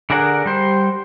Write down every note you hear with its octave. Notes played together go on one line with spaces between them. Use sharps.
D3 D4 G#4 A#4 F#5
G3 C5